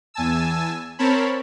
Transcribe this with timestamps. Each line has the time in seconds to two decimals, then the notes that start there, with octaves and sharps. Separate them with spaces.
0.14 E2 G#5 A5 E6
0.99 C4 A#4 C5 C#5 A5 B5